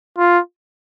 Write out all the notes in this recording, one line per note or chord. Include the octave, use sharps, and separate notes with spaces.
F4